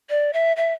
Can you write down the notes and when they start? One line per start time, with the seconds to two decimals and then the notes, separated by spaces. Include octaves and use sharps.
0.10 D5
0.33 E5
0.57 E5